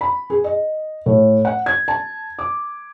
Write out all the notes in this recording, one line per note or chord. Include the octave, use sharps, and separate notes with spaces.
B5
G#4
D#5
A2
F#5
G#6
A5
D6